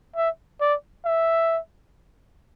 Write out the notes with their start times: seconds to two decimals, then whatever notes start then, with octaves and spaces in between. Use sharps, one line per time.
0.16 E5
0.61 D5
1.05 E5